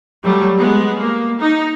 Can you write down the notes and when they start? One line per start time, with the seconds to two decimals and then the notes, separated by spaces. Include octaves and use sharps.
0.24 F#3 G3 A3
0.57 G#3 B3
0.97 A#3
1.40 D#4